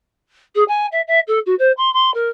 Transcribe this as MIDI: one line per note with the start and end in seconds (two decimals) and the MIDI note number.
0.55 0.64 68
0.68 0.87 80
0.92 1.01 76
1.08 1.20 76
1.28 1.39 69
1.46 1.55 66
1.59 1.72 72
1.77 1.92 84
1.93 2.13 84
2.14 2.29 70